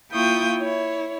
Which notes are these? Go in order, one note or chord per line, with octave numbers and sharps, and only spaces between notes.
A#3 E4 F4 G5 C#6 D#6
E4 C#5